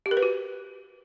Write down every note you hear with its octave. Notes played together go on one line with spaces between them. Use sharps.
G4
A#4
B4
F#4